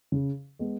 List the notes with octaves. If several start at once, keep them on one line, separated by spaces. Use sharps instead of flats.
C#3
G#3 B3